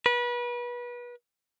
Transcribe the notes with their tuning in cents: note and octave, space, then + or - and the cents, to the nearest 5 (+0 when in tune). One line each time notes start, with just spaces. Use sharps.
B4 -30